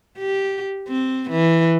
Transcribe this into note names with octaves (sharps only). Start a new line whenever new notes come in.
G4
C4
E3